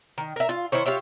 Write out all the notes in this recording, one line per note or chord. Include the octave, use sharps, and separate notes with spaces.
D#3
A#4 E5
F4
D#3 E4 C5 C#5
F4 G4 C#5 E5